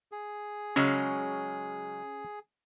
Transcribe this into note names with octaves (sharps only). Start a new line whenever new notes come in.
G#4
C#3 F#3 G#3 C#4